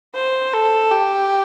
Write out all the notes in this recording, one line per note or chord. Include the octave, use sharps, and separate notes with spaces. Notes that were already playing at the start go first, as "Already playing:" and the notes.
C5
A4
G4